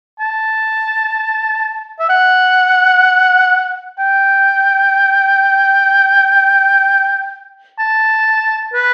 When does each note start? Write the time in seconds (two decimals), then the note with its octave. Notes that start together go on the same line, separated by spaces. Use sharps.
0.20 A5
1.99 E5
2.09 F#5
3.99 G5
7.79 A5
8.74 B4